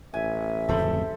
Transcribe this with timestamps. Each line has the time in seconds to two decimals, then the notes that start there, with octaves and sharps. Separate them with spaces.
0.14 A1 E5 G#5
0.69 D1 F2 C#3 A4 C5 B5